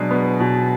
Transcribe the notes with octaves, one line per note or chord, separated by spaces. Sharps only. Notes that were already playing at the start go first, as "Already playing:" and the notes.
Already playing: B2 F#3 G#3 D4
B3
B2